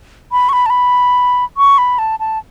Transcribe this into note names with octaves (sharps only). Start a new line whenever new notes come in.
B5
C#6
B5
A5
B5
C#6
B5
A5
A5